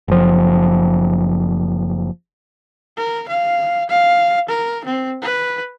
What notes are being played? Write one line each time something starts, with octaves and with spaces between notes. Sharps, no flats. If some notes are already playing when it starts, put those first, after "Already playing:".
F#1 F3
A#4
F5
F5
A#4
C4
B4